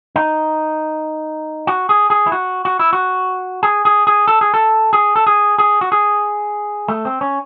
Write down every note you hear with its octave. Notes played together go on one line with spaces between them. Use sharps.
D#4
F#4
G#4
G#4
E4
F#4
F#4
E4
F#4
G#4
G#4
G#4
A4
G#4
A4
G#4
A4
G#4
G#4
F#4
G#4
A3
C4
C#4